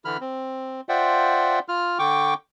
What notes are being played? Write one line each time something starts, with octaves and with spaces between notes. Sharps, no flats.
D3 E3 B5 F6
C4
F4 C5 D5 E5 F#5 G5
F4 F6
D3 G5 C#6 D6